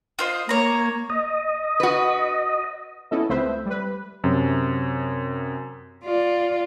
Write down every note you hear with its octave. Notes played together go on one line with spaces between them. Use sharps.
F4 C5 D#5
A#3 C#5 A#5
D#5
F#4 B4
B3 C#4 E4 A4 D#5
C#2 A3 C4 B4 C5 E5
G3 B4
F#2 C3
F4 D5